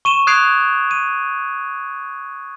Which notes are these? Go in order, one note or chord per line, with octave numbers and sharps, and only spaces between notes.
C#6 D#7 E7 G7
D#6 F#6 G#6 C7 D7 F7
D#7